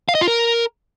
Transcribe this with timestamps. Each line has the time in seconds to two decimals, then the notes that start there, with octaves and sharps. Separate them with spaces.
0.09 F5
0.15 D#5
0.21 F4
0.28 A#4